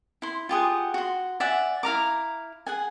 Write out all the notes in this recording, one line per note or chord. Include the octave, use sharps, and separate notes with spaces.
E4 C6
F4 G4 G#4 F#5
F#4 C6
D5 E5 F#5 G#5
E4 F5 A#5 D6
G#4 F#5 G#5